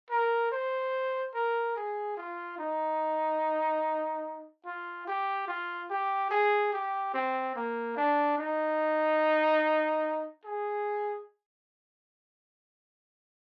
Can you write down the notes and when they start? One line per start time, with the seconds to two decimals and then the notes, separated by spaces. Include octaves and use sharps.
0.10 A#4
0.52 C5
1.34 A#4
1.76 G#4
2.17 F4
2.59 D#4
4.65 F4
5.07 G4
5.48 F4
5.90 G4
6.31 G#4
6.72 G4
7.14 C4
7.56 A#3
7.97 D4
8.38 D#4
10.45 G#4